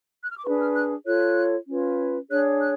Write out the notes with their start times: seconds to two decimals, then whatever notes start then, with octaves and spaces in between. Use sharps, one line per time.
0.23 F#6
0.31 F6
0.38 D6
0.44 D4 G#4 B4 C#6
0.60 F6
0.75 F#6
1.06 F4 A4 C#5 F#6
1.68 C#4 F4 B4
2.29 D4 G#4 C#5 F#6
2.60 F#6